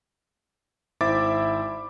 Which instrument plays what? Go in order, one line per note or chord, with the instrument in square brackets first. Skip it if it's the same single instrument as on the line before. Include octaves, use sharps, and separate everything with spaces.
[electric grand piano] G#1 E4 C5 E5 D6 A6